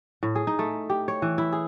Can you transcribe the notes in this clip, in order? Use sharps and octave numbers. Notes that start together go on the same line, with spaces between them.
A2
G#4
D#4
A3
G4
C#5
E3
E4
G#4